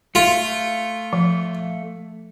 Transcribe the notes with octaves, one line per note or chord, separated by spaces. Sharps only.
A3 F4
F3